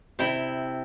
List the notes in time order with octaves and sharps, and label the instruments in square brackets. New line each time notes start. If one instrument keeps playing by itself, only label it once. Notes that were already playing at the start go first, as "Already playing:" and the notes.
[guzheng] C3 E4